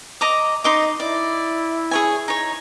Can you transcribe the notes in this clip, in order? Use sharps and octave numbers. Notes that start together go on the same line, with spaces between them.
D#5 A#5 D6
D#4 D#5 C6 D6
E4 D5
G#4 C#5 G#5
D#4 C#5